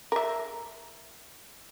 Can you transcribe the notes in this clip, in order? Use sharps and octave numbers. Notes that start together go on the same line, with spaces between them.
A#4 E5